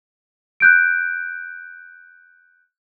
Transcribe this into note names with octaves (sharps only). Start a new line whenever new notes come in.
F#6 G6 D7